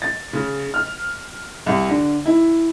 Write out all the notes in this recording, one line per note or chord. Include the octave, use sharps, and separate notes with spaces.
A6
C#3
F6
C2
D3
E4